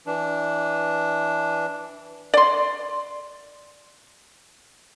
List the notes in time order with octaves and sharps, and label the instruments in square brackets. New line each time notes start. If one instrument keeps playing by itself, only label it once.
[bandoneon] E3 D4
[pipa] D5 C6